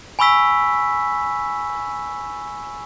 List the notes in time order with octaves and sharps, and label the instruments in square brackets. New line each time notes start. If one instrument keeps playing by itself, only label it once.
[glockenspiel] G#5 B5 C#6 E6 B6